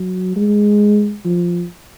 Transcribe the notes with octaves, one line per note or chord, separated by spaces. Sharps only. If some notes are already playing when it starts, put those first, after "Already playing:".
Already playing: F#3
G#3
F3